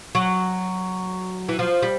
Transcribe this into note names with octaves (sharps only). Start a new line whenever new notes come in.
F#3
E3
F3
G3